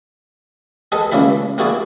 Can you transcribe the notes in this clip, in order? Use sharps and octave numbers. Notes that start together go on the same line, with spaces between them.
G#4 A4 B4 D#5 A5
C#2 C#3 A#3 E4 B5
A#3 E4 F#4 G#4 D5